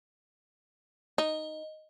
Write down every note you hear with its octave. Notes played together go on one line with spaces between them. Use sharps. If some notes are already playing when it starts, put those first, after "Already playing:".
D#4 D#5